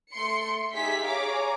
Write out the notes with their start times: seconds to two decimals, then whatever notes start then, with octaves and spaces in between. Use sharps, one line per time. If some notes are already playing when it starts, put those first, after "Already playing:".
0.13 A3 C6 C#7
0.73 D#4 G4 G#4 E5 B6
1.05 G#4 C#5 F5 A#5 D6